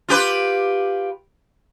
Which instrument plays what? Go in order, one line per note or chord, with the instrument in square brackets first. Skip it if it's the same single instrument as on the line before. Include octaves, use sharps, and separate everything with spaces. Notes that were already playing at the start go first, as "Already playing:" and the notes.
[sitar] F4 G4 B4